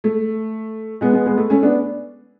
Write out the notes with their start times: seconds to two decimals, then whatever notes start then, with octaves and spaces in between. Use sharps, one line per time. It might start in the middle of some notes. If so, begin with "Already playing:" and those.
0.04 A3
1.01 G#3 B3
1.13 G#3 B3
1.26 G#3 B3
1.37 A3
1.50 A3 C#4
1.62 B3 D4